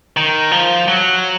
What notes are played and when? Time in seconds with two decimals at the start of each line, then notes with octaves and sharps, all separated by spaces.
0.17 D#3
0.51 F3
0.88 F#3